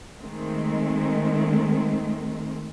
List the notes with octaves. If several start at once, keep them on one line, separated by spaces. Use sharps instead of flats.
D#3 G#3 A3 C4